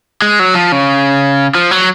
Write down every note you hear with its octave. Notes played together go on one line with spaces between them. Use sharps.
G#3
F#3
F3
C#3
F3
F#3